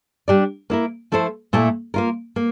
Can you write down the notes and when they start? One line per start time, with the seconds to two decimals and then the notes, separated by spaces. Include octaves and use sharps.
0.28 G3 D4 G4 D5
0.70 A#3 E4 A#4
1.12 F3 A3 E4 A4 C5
1.53 A#2 A3 E4 A4 E5
1.94 A#3 F4 A#4
2.36 A#3